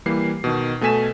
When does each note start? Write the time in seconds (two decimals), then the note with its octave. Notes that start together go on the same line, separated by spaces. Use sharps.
0.06 E3 G3 A#3 C7
0.44 B2 D#3
0.81 B2 A3 A4 G#5 B6 E7